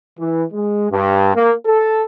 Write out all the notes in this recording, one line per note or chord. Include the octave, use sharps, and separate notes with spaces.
E3
G#3
G2
A#3
A4